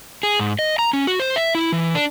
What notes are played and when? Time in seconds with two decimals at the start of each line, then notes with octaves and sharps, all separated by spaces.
0.23 G#4
0.40 G#2
0.59 D#5
0.79 A#5
0.93 C#4
1.07 F#4
1.20 C5
1.36 E5
1.55 E4
1.72 E3
1.95 D4